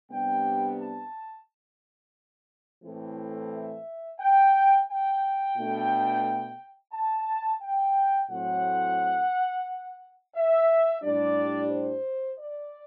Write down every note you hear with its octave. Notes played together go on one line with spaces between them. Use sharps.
C3 G3 B3 D4 G5
A5
A2 E3 A3 C4
E5
G5
G5
B2 A3 D4
A5
G5
A2 F#3 C4 F#5
E5
A2 G3 D4 D5
C5
D5